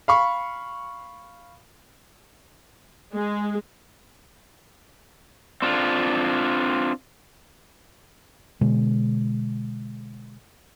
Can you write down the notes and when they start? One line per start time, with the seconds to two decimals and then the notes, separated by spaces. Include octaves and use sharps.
0.08 F5 B5 C#6
3.15 G#3
5.62 C4 D4 F4
8.61 B2 D3 G#3